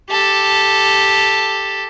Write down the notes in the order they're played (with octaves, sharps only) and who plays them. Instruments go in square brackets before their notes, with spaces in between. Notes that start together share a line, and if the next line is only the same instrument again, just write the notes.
[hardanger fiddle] G4 A4